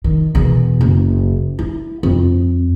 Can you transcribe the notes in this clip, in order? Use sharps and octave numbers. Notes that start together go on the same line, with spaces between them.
D#3
E2 B2
F#1
E4
F2